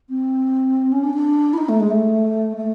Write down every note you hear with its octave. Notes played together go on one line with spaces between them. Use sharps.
C4
C#4
D4
D4
E4
D#4
A3
G#3
A3
A3